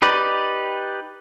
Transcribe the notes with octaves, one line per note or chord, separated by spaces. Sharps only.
D#4 G4 B4 D5